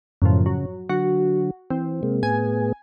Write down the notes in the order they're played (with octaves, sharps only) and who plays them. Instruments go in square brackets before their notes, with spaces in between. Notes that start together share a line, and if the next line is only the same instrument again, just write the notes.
[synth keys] F#2 A2 F3 [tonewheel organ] C#3
[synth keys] F#3
[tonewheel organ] D3 F#3 [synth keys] F#4
[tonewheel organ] E3 [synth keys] C4
[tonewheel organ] C3 G#3 A#3
[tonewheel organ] A2 B3 G#4 [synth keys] G#5